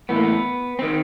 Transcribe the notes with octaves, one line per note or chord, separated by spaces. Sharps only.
A2 E3 B3
A#3
B3
D#3 C4